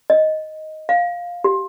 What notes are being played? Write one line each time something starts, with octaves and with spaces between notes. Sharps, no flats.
D#5
F5
G4